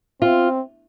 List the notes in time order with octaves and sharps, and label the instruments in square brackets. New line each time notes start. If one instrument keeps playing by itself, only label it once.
[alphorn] C4 [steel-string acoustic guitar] F4